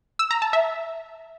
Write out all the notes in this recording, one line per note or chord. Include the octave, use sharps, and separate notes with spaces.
E6
A#5
A5
E5